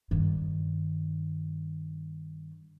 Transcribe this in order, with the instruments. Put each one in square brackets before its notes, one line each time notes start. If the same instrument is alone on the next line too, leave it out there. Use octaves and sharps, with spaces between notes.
[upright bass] G2 D#3